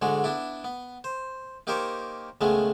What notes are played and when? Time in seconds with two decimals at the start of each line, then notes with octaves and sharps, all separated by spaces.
0.02 G#2 D3 G#3 F#4
0.24 B3 D4 E4
0.64 B3
1.04 C5
1.67 A#3 D#4 G4 A#4 C5 C#5
2.41 C#2 D#3 G#3 A3 B3